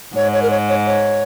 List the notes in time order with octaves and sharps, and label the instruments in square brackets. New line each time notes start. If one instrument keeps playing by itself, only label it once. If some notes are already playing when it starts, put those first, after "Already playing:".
[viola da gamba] G#2 [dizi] C#5
[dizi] C#5
A#4
C#5
C#5
C#5